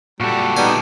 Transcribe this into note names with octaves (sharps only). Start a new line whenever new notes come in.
A#2 G3 F#4 A4
G3 B3 D#4 G4 G#5